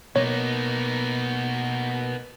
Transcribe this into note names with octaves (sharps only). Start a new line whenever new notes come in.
B2 A#3 B3 D#4 C#5